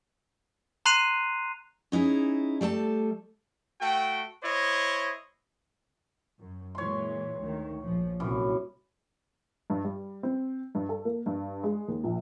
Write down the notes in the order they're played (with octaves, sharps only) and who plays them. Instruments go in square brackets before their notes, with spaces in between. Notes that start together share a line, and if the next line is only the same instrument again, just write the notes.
[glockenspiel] A#5 C6 F#6 C7 D#7 F7
[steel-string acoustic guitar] C#4 D#4 E4 G#4
G3 A3 A4 A5
[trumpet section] A3 F#4 G5
E4 C5 C#5 D#5
[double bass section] F#2
[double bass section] A#2 E3 G#3 [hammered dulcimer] C#5 C6
[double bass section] D2 D#3
A#1 F3
[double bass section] C2 A#2 [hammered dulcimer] F#2 E3
[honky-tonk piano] G2
G3
C4
G2
A4
A#3
G2
G#3
D#2
A#1